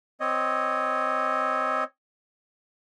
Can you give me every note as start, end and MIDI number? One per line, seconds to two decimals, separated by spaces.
0.20 1.84 60
0.20 1.84 73
0.20 1.84 75